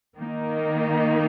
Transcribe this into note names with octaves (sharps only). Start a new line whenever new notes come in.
D#3 A#3 D#4